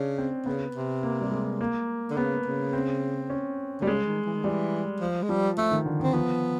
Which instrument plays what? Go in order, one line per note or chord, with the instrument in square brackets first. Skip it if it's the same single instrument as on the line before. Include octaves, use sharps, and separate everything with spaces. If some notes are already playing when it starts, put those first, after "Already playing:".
Already playing: [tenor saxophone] C#3 [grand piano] C#4 D4
[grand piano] C4
[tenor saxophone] C#3 [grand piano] B3
[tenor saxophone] C3
[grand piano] A#3
G3
G#3
A#3
[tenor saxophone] D3
[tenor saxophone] C#3 [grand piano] B3
[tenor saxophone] C#3
[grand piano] C4
C#4
[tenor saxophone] D3 [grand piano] G3
[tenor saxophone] C#3 [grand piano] G#3
[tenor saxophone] D#3
E3
D#3
[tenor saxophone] E3 [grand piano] G3
[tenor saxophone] F3
G#3
[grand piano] F3 [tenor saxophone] G3
[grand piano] F3 [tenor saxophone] A3
[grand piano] D#3
D3
[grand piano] D#3 [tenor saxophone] C4
[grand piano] F3 [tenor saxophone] B3